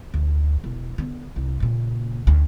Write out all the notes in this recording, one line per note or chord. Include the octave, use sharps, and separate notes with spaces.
D2
E1
D3 B3
C2
A#2 C#3
D2